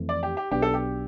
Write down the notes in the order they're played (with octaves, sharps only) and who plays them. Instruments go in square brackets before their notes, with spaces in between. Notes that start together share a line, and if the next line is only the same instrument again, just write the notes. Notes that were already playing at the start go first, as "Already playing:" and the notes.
Already playing: [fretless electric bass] F2 E3 A3 C4
[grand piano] D5
G4
G4
[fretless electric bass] B1 B2 B3 D4 [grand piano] G4
[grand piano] A4
G4